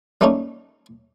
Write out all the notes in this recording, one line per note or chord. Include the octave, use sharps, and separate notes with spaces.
G3 A3 A#3 C#4 D#4